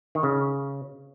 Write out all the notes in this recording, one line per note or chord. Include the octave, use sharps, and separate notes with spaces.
D#3
C#3